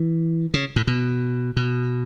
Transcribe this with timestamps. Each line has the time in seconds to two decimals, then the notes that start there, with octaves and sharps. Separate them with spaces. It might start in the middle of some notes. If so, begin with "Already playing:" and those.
Already playing: E3
0.54 C#3
0.76 A2
0.87 B2
1.57 B2